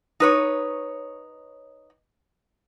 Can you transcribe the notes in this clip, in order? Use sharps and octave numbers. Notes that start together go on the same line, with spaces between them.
D#4 B4 C#5